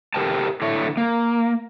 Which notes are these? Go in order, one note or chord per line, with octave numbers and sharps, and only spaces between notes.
G4 A4 A#4 C5 G5 A5
D3 E4 A4 C#5
A#3